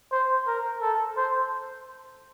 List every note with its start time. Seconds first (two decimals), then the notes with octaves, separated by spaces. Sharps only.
0.12 C5
0.47 A#4
0.81 A4
1.17 C5